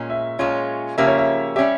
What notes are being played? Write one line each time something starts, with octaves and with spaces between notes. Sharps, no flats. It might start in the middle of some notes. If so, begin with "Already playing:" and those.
Already playing: A#2 G#3 C#4
E5
A#2 G#3 C#4 F4 C#5
C#3 F3 A#3 C#4 G4 E5
C#5
E5
G3 C#4 G4 E5